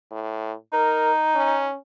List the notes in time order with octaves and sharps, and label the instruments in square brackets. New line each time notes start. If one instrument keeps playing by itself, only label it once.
[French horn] A2
[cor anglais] D#4 [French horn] A#4
[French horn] C#4